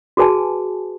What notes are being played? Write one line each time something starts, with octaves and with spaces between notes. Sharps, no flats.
F#4 G#4 B4 G#5 A5